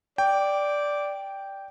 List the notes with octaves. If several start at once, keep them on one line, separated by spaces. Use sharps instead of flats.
D5 G5